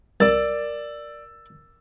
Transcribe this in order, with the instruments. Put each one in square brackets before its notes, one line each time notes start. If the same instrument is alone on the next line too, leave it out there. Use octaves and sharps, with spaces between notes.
[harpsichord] C2 [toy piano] A#4 [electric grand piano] D5 E6 A6